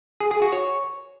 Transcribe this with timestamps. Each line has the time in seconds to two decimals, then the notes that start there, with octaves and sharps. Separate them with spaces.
0.20 G#4
0.31 G#4
0.42 F#4
0.52 C#5